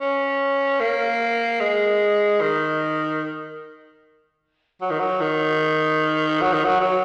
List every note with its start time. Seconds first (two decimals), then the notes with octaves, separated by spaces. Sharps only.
0.01 C#4
0.80 A#3
1.60 G#3
2.41 D#3
4.81 F#3
4.90 D#3
4.99 F#3
5.21 D#3
6.41 F#3
6.53 D#3
6.64 F#3
6.80 F#3